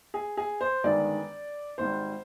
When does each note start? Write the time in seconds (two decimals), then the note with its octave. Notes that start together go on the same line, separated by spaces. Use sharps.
0.14 G#4
0.37 G#4
0.61 C5
0.84 G1 G2 D#3 G#3 D5
1.78 G#1 G#2 G3 C5